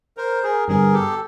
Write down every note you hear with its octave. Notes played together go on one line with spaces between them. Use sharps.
A#4 C5
G#4 A#4
G2 D3 G3 B3 G#4 A#4
G4 A4